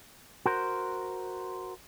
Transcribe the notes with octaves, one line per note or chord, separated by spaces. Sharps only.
F#4 A#4 C5